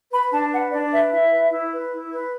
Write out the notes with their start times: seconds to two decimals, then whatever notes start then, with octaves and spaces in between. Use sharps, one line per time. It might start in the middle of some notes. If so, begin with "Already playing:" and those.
0.12 B4 B5
0.32 D4 A5
0.52 B4 F#5
0.72 D4 D5
0.92 B4 E5
1.12 E4 E5
1.31 B4
1.51 E4
1.72 B4
1.92 E4
2.12 B4